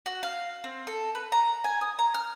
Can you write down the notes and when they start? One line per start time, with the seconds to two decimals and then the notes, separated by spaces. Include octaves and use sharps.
0.06 F#4
0.23 F5
0.64 C4
0.87 A4
1.15 B4
1.32 A#5
1.64 G#5
1.81 D#6
1.99 A#5
2.14 F6